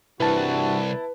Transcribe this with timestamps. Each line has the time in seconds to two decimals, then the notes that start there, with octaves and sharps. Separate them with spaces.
0.20 C2 G2 E3 E4 F#4 B4 A5